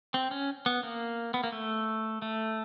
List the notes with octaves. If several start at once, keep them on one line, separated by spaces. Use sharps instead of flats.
C4
C#4
B3
A#3
B3
A#3
A3
A3